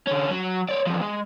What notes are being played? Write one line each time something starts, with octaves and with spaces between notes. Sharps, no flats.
D3 C#4
F#3
C#5 D5
E2 F3
G#3